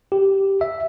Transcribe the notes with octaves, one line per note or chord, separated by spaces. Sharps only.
G4
E5